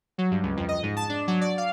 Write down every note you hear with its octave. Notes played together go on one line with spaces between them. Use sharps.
F#3
G2
C#2
F2
D#5
G#2
A5
D4
F#3
D5
F5